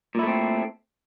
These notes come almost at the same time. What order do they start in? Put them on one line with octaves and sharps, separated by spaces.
A#2 E4 A3 C4